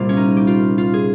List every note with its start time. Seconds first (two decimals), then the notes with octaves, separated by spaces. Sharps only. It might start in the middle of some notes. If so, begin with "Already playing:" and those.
Already playing: C2 A#2 G3 A#3 F4
0.09 C#4
0.17 D#4
0.37 G4
0.47 F4
0.78 F4
0.94 G#4